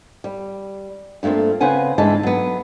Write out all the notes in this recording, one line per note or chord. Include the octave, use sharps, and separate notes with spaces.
G3
G2 A3 A#3 C4 F4
C#3 C4 B4 F#5 G#5
D2 G#2 E3 G#3 A5
F#3 B3